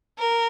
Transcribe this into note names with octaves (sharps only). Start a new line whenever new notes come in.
A#4